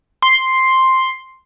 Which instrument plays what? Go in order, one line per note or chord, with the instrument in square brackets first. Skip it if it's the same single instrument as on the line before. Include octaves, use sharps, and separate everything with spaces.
[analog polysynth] C6